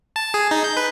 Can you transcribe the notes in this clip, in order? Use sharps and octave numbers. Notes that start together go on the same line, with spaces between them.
A5
G#4
D#4
G6
B4